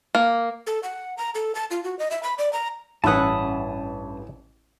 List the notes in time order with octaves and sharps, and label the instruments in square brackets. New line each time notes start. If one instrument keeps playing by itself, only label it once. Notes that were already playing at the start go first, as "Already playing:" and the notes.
[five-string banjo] A#3
[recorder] A4
F#5
A#5
A4
A5
F4
F#4
D#5
E5
B5
D5
A#5
[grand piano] A1 [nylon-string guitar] G2 C#4 B4 [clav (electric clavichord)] E4 F#5 [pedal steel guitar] A5 D#6